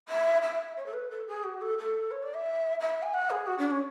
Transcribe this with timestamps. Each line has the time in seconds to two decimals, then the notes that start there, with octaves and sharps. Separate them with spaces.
0.08 E5
0.42 E5
0.76 C#5
0.86 A4
0.93 B4
1.10 A4
1.27 G#4
1.43 F#4
1.61 A4
1.78 A4
2.11 C#5
2.22 D5
2.34 E5
2.80 E5
3.02 G#5
3.13 F#5
3.30 G#4
3.46 F#4
3.58 D4
3.70 C#4